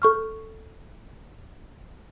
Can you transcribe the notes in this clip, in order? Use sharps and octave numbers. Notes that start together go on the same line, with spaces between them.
A4 C#6 F6